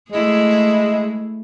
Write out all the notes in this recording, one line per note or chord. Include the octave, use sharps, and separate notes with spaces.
G#3 A3 E4 G#4